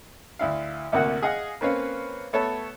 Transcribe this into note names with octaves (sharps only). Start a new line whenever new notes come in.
D2 E4 F5
A1 D2 C3 A#3 F#4 F#5
G#4 D#5 F5 F#5
A#3 C4 C#4 B4 C#5 F5
A3 B3 A4 C#5 A5